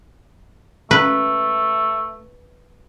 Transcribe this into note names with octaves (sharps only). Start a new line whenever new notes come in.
A3 B4